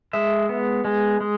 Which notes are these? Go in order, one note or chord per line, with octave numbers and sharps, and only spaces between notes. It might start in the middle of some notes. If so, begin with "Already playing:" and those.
G#3 E5
B3
G#3
G#3